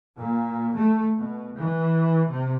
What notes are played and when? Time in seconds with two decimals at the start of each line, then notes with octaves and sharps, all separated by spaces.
0.18 A#2
0.76 A3
1.18 B2
1.58 E3
2.28 C3